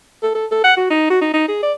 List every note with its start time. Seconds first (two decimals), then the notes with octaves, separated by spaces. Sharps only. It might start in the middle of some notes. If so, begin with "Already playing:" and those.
0.23 A4
0.35 A4
0.51 A4
0.64 F#5
0.77 F#4
0.90 D#4
1.10 F#4
1.21 D#4
1.34 D#4
1.48 G#4
1.63 D5